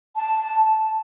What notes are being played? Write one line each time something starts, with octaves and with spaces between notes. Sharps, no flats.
A5